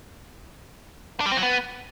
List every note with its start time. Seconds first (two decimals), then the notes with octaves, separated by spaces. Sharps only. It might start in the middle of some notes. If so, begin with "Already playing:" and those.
1.20 D4
1.26 G3
1.31 C4
1.37 F#3
1.43 B3